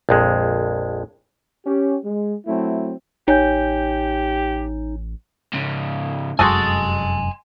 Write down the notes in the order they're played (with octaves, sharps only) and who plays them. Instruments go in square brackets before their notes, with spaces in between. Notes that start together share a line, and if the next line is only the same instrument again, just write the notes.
[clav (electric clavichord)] A#1 F2 G#3
[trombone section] C#4 G4
G#3
F#3 A3 C4 E4
[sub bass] A1 [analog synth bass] D#4 [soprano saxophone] G4 [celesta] C#5 G#5 G6
[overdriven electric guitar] G#2 C#3
[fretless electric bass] F1 F#2 G#3 [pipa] F#4 G#4 A4 [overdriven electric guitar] G#5 C6